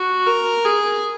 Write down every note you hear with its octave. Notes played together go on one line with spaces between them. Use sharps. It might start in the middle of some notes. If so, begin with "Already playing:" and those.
Already playing: F#4
A#4
G#4